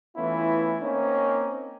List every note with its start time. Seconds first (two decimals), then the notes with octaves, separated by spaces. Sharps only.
0.16 E3 A3 B3 C#4 E4 F4
0.82 A#3 C4 C#4 D#4